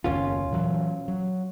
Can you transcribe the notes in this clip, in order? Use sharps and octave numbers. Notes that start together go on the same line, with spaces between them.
F#1 D#2 C#4 F4
A#2 E3 F#3
F#3